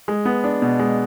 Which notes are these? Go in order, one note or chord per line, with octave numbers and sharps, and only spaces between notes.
G#3
B3
D4
B2
G#3